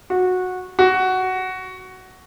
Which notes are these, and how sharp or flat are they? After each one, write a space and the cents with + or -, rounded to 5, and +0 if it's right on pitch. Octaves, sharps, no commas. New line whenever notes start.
F#4 -15
F#4 +10